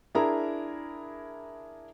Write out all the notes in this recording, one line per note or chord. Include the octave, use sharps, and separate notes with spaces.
D4 E4 G#4 A#4 A#5